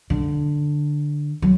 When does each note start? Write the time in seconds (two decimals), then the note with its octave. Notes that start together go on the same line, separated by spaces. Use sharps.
0.10 D3
1.42 F#3